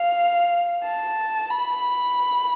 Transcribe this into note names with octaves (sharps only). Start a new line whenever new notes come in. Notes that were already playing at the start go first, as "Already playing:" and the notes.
Already playing: F5
A5
B5